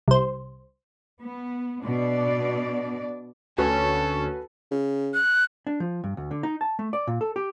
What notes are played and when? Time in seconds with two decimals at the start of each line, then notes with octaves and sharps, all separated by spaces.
0.08 C2 C5
1.21 B3
1.84 B2 D4 D5
3.58 D2 C#4 F#4 A4 B4
4.71 C#3
5.14 F#6
5.67 D4
5.80 F3
6.04 G2
6.17 D2
6.31 D3
6.43 D#4
6.61 A5
6.79 A3
6.93 D5
7.07 A#2
7.21 A4
7.36 G4